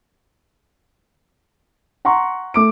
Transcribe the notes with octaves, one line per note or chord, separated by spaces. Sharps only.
F#5 A#5 C6 C#6
A3 D6 D7